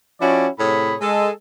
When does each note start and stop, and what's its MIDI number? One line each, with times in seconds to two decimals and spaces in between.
0.21 0.48 53
0.21 0.48 61
0.21 0.48 64
0.21 0.48 66
0.21 0.48 74
0.59 0.95 45
0.59 0.95 48
0.59 0.95 68
0.59 0.95 73
0.59 0.95 83
1.01 1.31 56
1.01 1.31 69